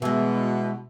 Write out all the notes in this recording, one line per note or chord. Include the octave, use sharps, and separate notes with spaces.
B2 E3 G#3